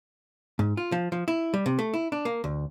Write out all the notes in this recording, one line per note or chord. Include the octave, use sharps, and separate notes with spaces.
G#2
F4
F3
F3
E4
G3
C3
A3
E4
D4
A#3
D2